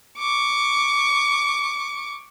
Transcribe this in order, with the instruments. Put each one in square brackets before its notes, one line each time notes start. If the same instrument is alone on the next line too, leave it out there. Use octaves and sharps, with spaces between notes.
[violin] C#6 D6